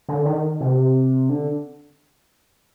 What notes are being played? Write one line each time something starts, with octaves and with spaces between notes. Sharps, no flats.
D3
D#3
C3
D3